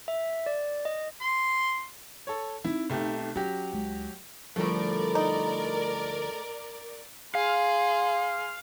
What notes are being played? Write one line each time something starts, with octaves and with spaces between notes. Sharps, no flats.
E5
D5
D#5
C6
A4 C#5
C4 D#4 E4
B1 A3 G4
F#3 C#4 G4
C#2
D2 A2 F3 G3 A3 A#4 D5
D#4
G#4 F5 C6